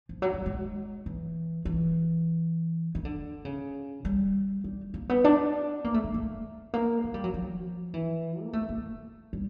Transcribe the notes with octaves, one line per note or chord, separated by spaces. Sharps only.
F3
F#3
G3
G#3
E3
E3
D#3
D3
C#3
G3
G3
A#3
B3
D4
A#3
A3
G#3
A3
A#3
G#3
G3
F#3
F3
E3
A#3
A3
A#3
G3